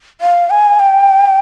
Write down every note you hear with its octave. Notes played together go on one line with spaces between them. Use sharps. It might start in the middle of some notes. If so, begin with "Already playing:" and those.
F5
G#5
G5